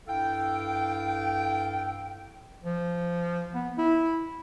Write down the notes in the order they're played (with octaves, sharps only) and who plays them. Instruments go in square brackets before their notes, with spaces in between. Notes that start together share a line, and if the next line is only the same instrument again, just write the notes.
[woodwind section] G2 E4 A4 F5 G5
[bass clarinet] F3
B3
E4